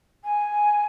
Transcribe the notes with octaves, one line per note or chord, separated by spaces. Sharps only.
G#5